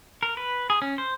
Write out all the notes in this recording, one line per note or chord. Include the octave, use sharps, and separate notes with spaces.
A#4
B4
G#4
C#4
C5